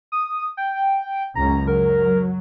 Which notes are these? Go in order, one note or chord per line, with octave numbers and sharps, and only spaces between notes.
D#6
G5
C#2 F#2 C#4 A#5
F#3 A#4